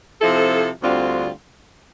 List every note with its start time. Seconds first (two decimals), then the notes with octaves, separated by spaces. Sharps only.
0.21 C3 F3 C4 E4 A4
0.82 D2 D3 G3 C4 F4